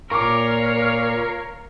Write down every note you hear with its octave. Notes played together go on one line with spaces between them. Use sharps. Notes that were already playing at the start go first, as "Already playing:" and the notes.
A#2 A#4 C#5 F5 C#6 D6